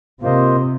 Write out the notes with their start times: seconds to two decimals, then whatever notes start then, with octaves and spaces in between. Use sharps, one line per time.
0.22 C3 A#3 F4 C5 D#5